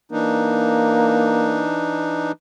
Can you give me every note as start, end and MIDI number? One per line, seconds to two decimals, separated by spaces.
0.12 2.32 52
0.12 1.65 58
0.12 2.32 62
0.12 2.32 63